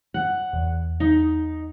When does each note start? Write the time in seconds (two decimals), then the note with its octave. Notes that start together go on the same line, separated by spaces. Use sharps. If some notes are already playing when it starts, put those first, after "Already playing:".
0.14 F#5
0.53 E2
1.00 D#4